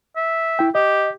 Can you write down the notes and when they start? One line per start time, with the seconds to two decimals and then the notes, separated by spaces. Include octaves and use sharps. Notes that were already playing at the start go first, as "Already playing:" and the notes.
0.17 E5
0.59 E4 G5
0.75 G4 D#5